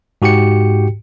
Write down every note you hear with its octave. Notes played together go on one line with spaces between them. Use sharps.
G#2 F#4 G4 G5 C#7